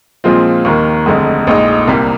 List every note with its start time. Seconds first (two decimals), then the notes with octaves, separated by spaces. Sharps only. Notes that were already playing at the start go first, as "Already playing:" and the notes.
0.24 A#2 F3 G#3 C4 F4
0.65 D#2 D#3 A#3
1.06 F1 F2 D3 G#3
1.47 A#1 A#2 G#3 D#4
1.87 C2 C3 G3 A#3